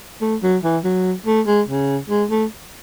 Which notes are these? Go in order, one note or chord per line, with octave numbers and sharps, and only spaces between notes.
A3
F#3
E3
F#3
A3
G#3
C#3
G#3
A3